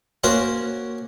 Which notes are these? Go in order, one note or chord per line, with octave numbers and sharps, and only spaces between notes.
A#3 C#4 F#4 A#4 C5 F#5